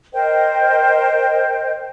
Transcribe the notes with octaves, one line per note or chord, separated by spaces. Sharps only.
A#4 C5 D#5 G5